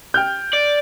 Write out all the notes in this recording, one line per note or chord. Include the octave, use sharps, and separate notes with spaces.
G5 F6 G6
D5